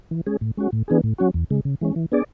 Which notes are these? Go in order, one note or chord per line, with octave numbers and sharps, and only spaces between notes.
E3
G#3 C#4 G#4
A2
G#3 C#4 F#4
A2
E3 B3 D4 G#4
A2
F#3 C#4 F#4
E2
C#3 G#3
C#3
E3 G#3 C#4
E3
B3 D4 G#4 D5